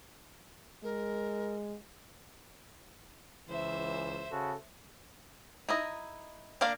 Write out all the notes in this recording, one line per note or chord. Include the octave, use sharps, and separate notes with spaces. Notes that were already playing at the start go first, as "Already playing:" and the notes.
G#3 A#4
C#2 E3 C5 E5
C#3 F#4 A4
D#4 E4 D#5
A#3 D4 D5 F5